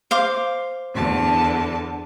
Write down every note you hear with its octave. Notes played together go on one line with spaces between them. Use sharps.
C5 F5 D6
E2 D3 A5